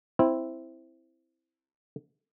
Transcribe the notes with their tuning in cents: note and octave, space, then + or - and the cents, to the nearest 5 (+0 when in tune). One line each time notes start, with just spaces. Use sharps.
C4 +0 E4 +0